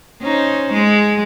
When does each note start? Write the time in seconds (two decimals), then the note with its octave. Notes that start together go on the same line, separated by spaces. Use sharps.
0.22 C#4 D#4 C5
0.73 G#3